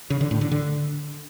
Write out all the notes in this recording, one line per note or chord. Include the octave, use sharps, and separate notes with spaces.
C#3
D3
A2
D3
D3